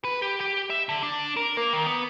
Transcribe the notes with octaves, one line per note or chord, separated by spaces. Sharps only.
B4
G4
G4
E5
D3
D4
A#4
A#3
D#3
B3